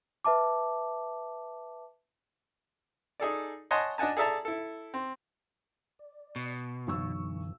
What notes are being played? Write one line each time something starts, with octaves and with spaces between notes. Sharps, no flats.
B4 E5 A5 D6
D#4 G#4 A4 D5
C#5 D#5 F#5 G#5 A5 C6
D4 D#5 F#5 G#5 A5
G#4 A4 D5 E5 A5 A#5
E4 A4
C4
D5
B2
B1 F#2 D3 E3 C#6 E6